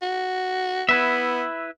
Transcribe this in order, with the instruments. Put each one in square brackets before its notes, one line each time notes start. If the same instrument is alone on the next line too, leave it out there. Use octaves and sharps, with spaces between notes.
[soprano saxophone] F#4
[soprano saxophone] B3 [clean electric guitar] E4 B4 E5